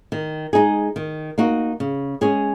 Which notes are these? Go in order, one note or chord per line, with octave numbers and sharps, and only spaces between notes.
D#3
G#3 D#4 G#4
D#3
A#3 D#4 F#4
C#3
G#3 C#4 G#4